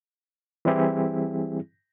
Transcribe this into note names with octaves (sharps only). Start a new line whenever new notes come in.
E3 G3 C4 E4 G4 G#4